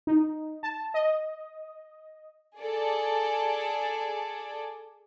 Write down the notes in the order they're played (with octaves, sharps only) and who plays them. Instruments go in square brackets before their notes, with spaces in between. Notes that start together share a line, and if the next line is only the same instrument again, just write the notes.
[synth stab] D#4
A5
D#5
[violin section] G#4 A4 D5